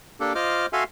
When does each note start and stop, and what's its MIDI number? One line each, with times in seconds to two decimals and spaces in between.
0.20 0.33 58
0.20 0.33 62
0.20 0.33 67
0.20 0.33 69
0.35 0.66 65
0.35 0.66 72
0.35 0.66 75
0.35 0.66 86
0.35 0.66 89
0.73 0.84 66
0.73 0.84 69
0.73 0.84 76
0.73 0.84 77
0.73 0.84 80
0.73 0.84 84